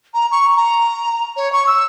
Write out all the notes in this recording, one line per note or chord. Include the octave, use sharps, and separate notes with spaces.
A#5
C#6
A#5
C#5
C#6
E6